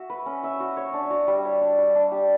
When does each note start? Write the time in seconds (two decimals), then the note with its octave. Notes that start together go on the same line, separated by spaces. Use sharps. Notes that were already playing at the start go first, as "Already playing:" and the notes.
Already playing: F#4 E5
0.10 B4
0.26 C#4
0.44 E5
0.60 F#4
0.77 C#5
0.93 D4
1.10 F#4
1.28 G3
1.45 C#5
1.61 D4
1.78 G3
1.95 D4
2.12 G4